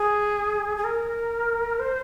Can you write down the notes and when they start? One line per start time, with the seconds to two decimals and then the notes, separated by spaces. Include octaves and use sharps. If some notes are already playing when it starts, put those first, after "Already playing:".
Already playing: G#4
0.77 G#4
0.84 A#4
1.79 C5